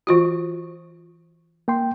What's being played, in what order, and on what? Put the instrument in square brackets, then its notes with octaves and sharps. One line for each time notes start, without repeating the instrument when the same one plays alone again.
[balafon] E3 F4 F#4
[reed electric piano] A#3 G5 C6